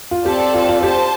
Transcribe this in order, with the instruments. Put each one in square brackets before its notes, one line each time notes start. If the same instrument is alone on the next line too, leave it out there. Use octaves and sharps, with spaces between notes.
[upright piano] F4
[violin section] C4 A4 D5 A5 [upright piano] G4
[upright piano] F4
F4
[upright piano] G4 [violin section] C5 A5